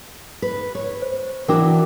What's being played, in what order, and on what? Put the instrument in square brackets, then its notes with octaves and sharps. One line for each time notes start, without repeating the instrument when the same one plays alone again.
[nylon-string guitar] B4
C#5
[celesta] C5
[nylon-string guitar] E3 D4 F#4 [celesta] A#4 G5 D6